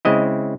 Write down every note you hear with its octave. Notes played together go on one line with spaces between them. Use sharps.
C#3 G#3 C4 E4 D#5